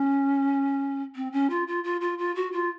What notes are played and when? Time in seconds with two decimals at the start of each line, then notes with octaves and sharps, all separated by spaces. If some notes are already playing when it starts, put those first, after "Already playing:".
Already playing: C#4
1.15 C4
1.32 C#4
1.50 F4
1.68 F4
1.84 F4
2.01 F4
2.18 F4
2.35 F#4
2.52 F4